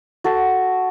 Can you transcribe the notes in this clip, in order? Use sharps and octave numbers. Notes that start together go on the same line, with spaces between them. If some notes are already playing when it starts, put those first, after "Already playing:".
F#4 A4